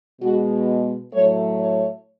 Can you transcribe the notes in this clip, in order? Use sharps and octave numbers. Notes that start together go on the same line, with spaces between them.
B2 G#3 F#4
A2 F#3 A3 C#5
C#5